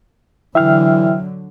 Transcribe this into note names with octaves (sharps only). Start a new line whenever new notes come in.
D3 E3 F#3 E5 G5 F6